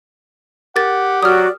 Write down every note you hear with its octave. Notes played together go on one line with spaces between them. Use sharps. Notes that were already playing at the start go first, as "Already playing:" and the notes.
G4 A#4 F#5 A6
F#3 F#4 D5 D#6 F6